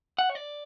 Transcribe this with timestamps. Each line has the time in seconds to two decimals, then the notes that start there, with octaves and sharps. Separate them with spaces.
0.18 F#5
0.30 C#5
0.35 D5